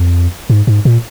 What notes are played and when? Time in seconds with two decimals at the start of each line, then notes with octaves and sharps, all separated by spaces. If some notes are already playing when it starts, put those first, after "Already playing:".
Already playing: F2
0.50 G#2
0.67 G#2
0.85 A#2